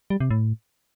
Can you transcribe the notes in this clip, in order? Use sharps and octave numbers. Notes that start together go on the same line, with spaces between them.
G3
C3
A2